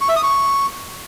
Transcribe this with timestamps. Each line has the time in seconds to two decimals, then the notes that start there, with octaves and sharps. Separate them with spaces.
0.01 C#6
0.09 E5
0.16 D#6
0.23 C#6